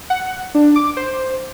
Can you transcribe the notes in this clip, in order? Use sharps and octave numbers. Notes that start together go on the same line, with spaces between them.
F#5
D4
D6
C5